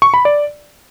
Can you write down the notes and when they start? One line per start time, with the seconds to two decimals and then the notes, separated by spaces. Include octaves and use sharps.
0.02 C#6
0.14 B5
0.25 D5